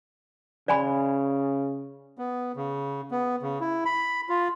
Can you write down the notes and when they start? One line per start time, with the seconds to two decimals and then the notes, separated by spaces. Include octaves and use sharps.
0.68 C#3 D5 G#5 B5
2.18 B3
2.56 C#3
3.11 B3
3.43 C#3
3.61 E4
3.85 B5
4.29 F4